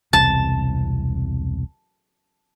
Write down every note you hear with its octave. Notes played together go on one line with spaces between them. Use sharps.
E1 C2 C3 A5